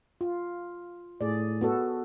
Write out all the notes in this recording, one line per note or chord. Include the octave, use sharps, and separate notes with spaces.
F4
A2 G#4 D5
B3 F#4 A4